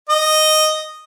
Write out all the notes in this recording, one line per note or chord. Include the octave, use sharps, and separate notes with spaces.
D#5